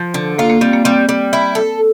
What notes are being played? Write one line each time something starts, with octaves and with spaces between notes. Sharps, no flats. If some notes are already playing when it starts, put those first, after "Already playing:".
Already playing: F3
D3
A#3 F4
A#3
G3 C4
A#3
G3 C4
G3
E4
A4